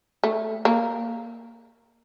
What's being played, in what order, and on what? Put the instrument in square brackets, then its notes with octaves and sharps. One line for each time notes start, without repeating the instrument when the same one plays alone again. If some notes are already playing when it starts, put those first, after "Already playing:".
[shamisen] A3
A#3